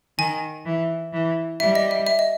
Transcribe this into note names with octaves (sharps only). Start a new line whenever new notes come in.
D#3 G#5
E3
E3
G3 E5
D#5
E5
E5
D#5